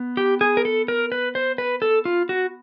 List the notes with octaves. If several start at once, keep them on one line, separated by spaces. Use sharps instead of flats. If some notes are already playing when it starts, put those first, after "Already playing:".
Already playing: B3
G4
G#4
A#4
A4
A#4
B4
C5
B4
A4
F4
F#4